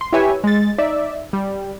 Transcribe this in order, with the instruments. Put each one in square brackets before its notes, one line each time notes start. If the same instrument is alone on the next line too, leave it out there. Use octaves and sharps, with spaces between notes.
[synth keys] C6
E4 G4 B4 C#5 E5 G#5
G#3 A6
D#4 D5 E5
G3